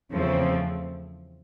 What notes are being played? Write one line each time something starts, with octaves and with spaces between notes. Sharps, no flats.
E2 C#3 F3 A3 C4